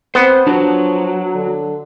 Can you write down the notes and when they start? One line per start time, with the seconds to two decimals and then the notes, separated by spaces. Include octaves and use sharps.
0.15 B3 C4 C5
0.47 F3 F#3 D4 F#4
1.35 D3